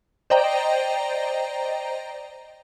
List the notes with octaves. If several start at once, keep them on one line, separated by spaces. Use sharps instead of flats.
C5 D5 D#5 G5 A#5